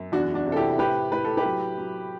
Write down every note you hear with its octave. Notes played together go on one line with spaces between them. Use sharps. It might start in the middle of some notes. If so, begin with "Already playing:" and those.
Already playing: F#2
E2 D4 F#4
D4 F#4
C3
A4
E4 G4
A2 G4 B4
A2 B4
A4
G4 B4
F#3
F#3